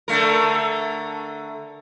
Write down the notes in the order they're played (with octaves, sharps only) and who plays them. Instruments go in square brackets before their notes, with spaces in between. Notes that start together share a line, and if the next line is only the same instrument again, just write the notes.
[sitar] D3 A3 A#4